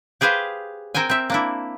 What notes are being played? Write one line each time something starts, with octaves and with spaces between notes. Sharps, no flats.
G4 G#4 B4 C5 F5
C4 A#4 C5 G5 G#5
C4 E5
A#3 D4 E4